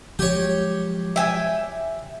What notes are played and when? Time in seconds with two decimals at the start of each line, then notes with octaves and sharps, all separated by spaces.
0.19 F3 F#3 G#3 G4 C#5
1.16 E5 G5 G#5